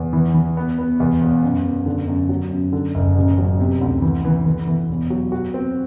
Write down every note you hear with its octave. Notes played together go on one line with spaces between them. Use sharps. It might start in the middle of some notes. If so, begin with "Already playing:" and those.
Already playing: E2
E3
E3
B3
B3
E2
E1
F#2
F#2
D3
F#2
F#3
F#2
D3
F#1
A1
F#3
C3
D2
E3
E3
E3
E3
E1
F#3
F#4
C4